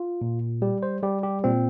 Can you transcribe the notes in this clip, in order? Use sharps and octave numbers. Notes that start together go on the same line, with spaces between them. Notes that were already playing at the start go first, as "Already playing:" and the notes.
Already playing: F4
A#2
G3 G4
C5
G3 G4
G4
A#2 C4